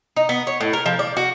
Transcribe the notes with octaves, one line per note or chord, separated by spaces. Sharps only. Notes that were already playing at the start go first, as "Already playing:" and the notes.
D#4
B3
C#5
A2
A#4
F3
D5
F#4